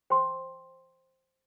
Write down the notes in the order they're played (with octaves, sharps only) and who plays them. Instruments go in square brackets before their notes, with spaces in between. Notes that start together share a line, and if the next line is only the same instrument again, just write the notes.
[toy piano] C5 G5 C6